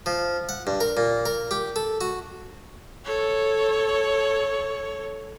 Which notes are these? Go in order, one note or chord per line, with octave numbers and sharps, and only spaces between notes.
F3
F#5
G2
A#4
A#2
A#4
G4
A4
F#4
A4 C#5